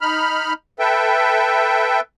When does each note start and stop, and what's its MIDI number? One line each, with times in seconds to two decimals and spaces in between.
0.01 0.53 63
0.01 0.53 83
0.01 0.53 89
0.79 2.00 69
0.79 2.00 71
0.79 2.00 76
0.79 2.00 79